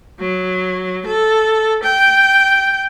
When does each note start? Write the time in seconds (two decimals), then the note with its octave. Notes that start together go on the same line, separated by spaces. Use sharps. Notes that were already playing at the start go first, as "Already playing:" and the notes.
0.19 F#3
1.05 A4
1.83 G5